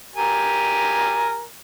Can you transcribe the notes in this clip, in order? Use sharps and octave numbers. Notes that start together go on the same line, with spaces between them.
G4 A#4 G#5